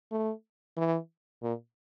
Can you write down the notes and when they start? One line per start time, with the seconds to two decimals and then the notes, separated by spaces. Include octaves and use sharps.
0.11 A3
0.77 E3
1.43 A#2